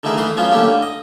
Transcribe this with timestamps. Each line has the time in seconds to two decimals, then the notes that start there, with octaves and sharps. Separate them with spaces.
0.03 D3 D#3 A3 E4 G#4 A#4
0.17 E3 A3 B4 C6 D#6
0.37 F3 F#3 B3 C#4 F4 C5
0.51 D3 A3 A#3 C#4 E4 G4
0.68 D3
0.82 D#5